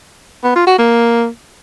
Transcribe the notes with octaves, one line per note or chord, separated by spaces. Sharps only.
B3
F4
F#4
A#3